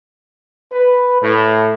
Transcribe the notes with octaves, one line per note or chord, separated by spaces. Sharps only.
B4
A2